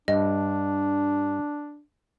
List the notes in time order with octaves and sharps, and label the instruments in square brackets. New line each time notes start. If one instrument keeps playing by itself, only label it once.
[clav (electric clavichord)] G2 [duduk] D4 [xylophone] D#5